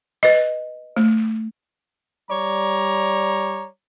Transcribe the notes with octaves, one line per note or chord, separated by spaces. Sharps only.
B4 D#5
A3
G3 C#5 D5 A#5